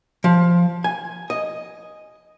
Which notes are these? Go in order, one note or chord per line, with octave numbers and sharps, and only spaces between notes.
F3
G#5
D#5